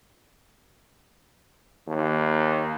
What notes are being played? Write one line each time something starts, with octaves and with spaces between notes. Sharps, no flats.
D#2